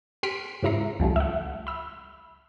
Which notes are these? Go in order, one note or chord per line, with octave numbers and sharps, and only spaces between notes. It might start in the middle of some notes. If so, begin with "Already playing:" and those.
G4 C6 F6 B6 D7
G#2 C#3 E4 E5 A#5 C7
C#2 F3 G3 A3
E5 F#5
B5 E6